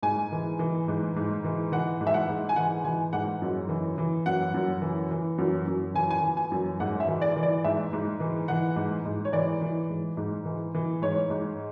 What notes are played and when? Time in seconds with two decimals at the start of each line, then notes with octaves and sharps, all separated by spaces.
0.03 G#2 G#5
0.32 E3
0.59 E3
0.88 G#2
1.16 G#2
1.44 E3
1.72 E3 F#5
2.01 G#2
2.07 E5
2.14 F#5
2.29 G#2
2.49 G#5
2.56 E3 F#5
2.84 E3 G#5
3.13 G#2 F#5
3.42 F#2
3.69 E3
3.98 E3
4.26 F#2 F#5
4.54 F#2
4.82 E3
5.11 E3
5.38 F#2
5.67 F#2
5.94 E3 G#5
6.10 G#5
6.23 E3
6.37 G#5
6.52 F#2
6.80 G#2 F#5
7.00 E5
7.08 E3
7.22 D5
7.36 E3
7.43 D5
7.64 G#2 E5
7.93 G#2
8.20 E3
8.48 E3 F#5
8.76 G#2
9.06 G#2
9.25 C#5
9.33 E3 D5
9.61 E3
9.89 G#2
10.17 G#2
10.45 E3
10.75 E3
11.02 G#2 C#5
11.30 G#2